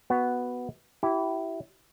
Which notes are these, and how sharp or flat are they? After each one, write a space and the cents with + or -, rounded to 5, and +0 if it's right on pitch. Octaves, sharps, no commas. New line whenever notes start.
B3 +0 F#4 +0
E4 +0 G4 -30